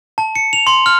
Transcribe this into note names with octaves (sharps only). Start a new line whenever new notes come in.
A5
C#7
F7
C6
F6